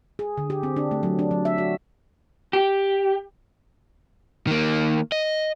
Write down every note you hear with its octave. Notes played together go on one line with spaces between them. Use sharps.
G#4
D3
G4
C4
D4
A3
F#3
D4
F#3
E5
F#4
G4
D#3 A#3
D#5